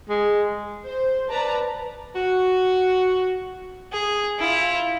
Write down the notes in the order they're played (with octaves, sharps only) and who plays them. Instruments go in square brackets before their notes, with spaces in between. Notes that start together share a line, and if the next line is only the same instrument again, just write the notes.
[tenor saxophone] G#3
[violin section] C5
B4 D5 A5 A#5
[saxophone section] F#4
[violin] G#4
E4 F4